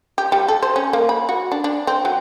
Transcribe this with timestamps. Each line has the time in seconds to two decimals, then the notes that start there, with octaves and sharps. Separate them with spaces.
0.18 G4
0.32 G3
0.48 A4
0.62 C5
0.76 C#4
0.93 A#3
1.09 B5
1.29 F#4
1.52 D4
1.64 D4
1.87 C4
2.05 F#3